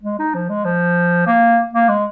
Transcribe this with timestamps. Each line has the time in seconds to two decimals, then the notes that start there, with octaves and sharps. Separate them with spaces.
0.03 G#3
0.19 D#4
0.35 F3
0.49 G#3
0.65 F3
1.27 A#3
1.73 A#3
1.89 G#3